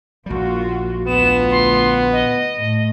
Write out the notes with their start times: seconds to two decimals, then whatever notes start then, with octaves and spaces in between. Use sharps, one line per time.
0.26 A#1 G3 A#3 F4 F#4
1.07 D2 B3 F4 E7
1.51 C6
2.12 D#5
2.56 A2